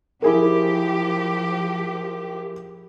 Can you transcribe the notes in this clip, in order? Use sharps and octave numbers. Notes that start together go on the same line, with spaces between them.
F3 E4 G4 G#4 A#4